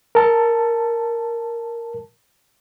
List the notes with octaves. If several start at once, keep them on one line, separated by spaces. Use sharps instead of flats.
A#4 A5